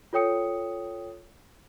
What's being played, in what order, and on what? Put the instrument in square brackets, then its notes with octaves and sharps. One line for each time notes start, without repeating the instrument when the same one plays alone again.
[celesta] F4 A4 C#5 G5 D#6 C#7